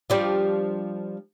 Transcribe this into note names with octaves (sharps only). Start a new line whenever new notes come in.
F3 G3 D4